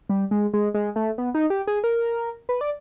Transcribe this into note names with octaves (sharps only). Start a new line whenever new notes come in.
G3
G#3
G#3
G#3
A3
B3
D#4
G4
G#4
A#4
B4
D5